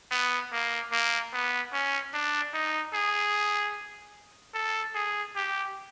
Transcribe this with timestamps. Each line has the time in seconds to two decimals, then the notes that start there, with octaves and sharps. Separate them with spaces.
0.11 B3
0.52 A#3
0.92 A#3
1.33 B3
1.73 C#4
2.13 D4
2.54 D#4
2.93 G#4
4.54 A4
4.95 G#4
5.36 G4